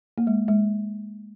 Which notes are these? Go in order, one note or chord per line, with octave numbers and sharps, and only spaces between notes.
A#3
G#3
G#3